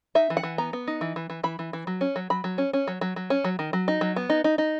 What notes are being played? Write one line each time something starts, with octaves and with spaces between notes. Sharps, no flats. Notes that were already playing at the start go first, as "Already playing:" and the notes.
D#4 E5
E3
F#5
E3
B3 A#5
B3
D#4
E3
E3
E3
E3 B5
E3
E3
F#3
C#4
F#3
F#3 B5
F#3
C#4
C#4
F#3
F#3
F#3
C#4
F#3
D#3
F#3
D#4
F#3
B3
D#4
D#4
D#4